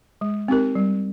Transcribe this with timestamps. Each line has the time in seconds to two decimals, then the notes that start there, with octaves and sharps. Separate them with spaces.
0.21 G#3
0.48 C4 D#4 G4 A#4
0.75 G3